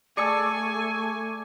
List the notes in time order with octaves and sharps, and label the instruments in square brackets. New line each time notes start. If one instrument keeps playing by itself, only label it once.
[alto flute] A3 [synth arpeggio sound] G#4 C#6 [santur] D5 A5 E6 [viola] G#5